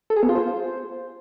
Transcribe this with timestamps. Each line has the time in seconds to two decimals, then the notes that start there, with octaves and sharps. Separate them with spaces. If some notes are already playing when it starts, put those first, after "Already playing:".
0.10 A4
0.16 G#4
0.23 B3
0.29 F4
0.35 C5